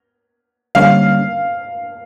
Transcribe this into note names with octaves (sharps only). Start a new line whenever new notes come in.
D3 G3 A#3 C#4 F5